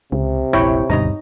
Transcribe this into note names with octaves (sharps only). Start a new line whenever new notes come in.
C#2 C3
E1 A#1 E4 C#5 G5 B5
D#1 D2 G2 B2 D#4 D#5 A#5